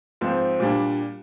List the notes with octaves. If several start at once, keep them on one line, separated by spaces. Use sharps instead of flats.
G#2 F3 C4
A#2 G3 D4